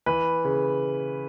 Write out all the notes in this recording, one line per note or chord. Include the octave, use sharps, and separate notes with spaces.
E3 B4
C#3